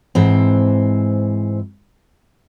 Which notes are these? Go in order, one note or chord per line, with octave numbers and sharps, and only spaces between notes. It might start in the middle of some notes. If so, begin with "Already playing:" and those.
G#2 E3 C4